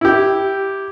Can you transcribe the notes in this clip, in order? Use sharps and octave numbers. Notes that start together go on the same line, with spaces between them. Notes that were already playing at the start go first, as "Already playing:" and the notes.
E4 G4